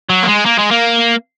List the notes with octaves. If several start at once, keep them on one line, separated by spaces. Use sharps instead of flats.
F#3
A#3
G#3
A#3
G#3
A#3